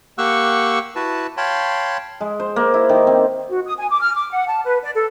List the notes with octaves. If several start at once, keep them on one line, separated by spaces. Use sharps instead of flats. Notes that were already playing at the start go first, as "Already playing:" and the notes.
A#3 G4 F#5 C#6 E6 F#6
E4 F#4 B4 A5
C#5 F5 G5 A5 B5 C6
G#3
C5
A#3
E4
D#3
C4
F#4
D#6
G#5
D6
F6
D6
F#5
A5
B4
D5
A4